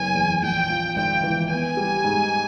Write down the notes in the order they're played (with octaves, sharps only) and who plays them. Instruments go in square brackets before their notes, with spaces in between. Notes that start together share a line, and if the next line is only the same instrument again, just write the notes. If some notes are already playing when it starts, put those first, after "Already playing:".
Already playing: [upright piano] F#1 B3 [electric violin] G#5
[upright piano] E2
[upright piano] A#1 [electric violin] G5
[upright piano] F3
[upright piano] G#1 [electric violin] G5
[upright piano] E3
[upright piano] B3 [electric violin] G#5
[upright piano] G3
G#2